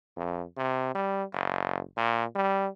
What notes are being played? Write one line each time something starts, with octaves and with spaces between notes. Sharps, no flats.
F2
C3
G3
F#1
A#2
G3